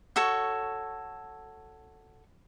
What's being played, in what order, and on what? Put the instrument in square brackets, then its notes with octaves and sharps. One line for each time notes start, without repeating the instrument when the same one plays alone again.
[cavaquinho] F#4 A4 C#5